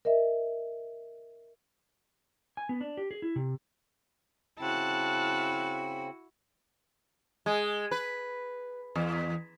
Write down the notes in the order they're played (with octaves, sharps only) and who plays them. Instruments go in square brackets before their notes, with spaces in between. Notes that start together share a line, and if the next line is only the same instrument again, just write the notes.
[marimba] A#4 D#5 E5
[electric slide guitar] G#5
B3
D4
G4
G#4
E4
C3
[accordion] C#3 C4 [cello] E4 F#4 [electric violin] A5 F#6
[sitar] G#3
B4
E2